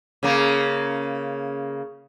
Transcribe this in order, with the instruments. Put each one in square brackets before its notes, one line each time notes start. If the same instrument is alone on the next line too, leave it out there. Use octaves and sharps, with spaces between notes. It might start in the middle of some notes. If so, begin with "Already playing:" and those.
[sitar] C#3 A#3